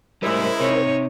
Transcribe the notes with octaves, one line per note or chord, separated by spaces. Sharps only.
A2 C#3 G3 G#3 E4 A#4 C5
C3 D#4 C#5